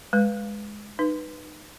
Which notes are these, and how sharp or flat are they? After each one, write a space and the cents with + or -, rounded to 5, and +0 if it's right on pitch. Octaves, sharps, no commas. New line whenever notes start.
G#3 +0 B4 +0
D#4 -25 B4 +0